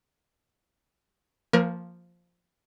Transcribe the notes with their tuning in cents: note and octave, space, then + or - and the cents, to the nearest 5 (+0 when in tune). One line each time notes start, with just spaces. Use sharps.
F3 +0 A#3 -15 A#4 +35